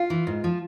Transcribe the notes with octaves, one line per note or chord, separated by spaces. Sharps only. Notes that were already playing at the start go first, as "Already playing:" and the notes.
Already playing: F4
E3
G#2
F3